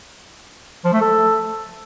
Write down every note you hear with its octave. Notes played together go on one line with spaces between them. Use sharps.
F3
A3
A4